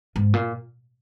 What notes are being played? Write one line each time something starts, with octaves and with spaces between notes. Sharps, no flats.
G#2
A#2